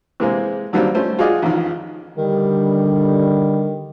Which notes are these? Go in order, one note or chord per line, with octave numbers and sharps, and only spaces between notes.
C3 E3 G#3 A#3 C4 G#4
D3 D#3 F#3 G3 A#3 C4
G3 A3 C#4 C5
F4 F#4 G#4 D5 D#5
A1 F2 A2 D#3
D3 D#3 G3